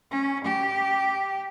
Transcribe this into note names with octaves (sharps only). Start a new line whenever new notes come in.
C#4
G4